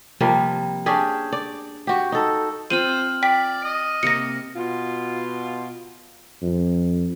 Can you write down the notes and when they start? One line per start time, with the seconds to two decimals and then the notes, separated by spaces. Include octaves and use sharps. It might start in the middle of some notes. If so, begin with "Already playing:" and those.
0.20 C3 F3 G3 A#3
0.86 C#4 D4 G4 G#4
1.32 D5
1.87 F#4 G4
2.12 D#4 A4
2.70 C4 F4 C5 F5 F6 D#7 F#7
3.23 D5 G5 B6
3.64 D#5
4.03 C3 A#3 A#6 C#7
4.56 B2 F4
6.42 F2